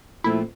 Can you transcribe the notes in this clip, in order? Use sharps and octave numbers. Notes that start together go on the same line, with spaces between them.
A#2 F3 A3 C4 E4